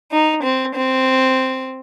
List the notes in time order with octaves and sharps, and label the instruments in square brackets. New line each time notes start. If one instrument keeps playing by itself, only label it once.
[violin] D#4
C4
C4